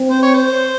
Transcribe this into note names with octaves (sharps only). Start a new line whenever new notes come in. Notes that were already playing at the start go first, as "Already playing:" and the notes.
Already playing: C4
C5
C#5
C5